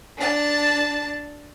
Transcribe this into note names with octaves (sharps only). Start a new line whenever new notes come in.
D4 A5